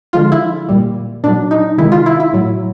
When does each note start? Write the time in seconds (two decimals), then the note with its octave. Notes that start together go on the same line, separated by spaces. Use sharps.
0.13 D3 F3 G#3 F4
0.32 E4
0.69 A#2 G3
1.24 A#2 F#3 D4
1.51 D#4
1.78 C3 D#3 G#3 E4
1.92 F4
2.06 E4
2.20 E4
2.33 A2 F#3